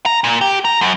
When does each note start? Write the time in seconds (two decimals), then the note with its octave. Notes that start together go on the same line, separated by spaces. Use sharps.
0.06 A#5
0.24 A#2
0.41 G4
0.65 A#5
0.81 F#2